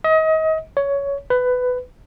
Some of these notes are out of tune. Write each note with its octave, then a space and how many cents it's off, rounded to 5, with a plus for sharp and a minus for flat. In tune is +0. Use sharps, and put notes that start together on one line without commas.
D#5 +30
C#5 +15
B4 +15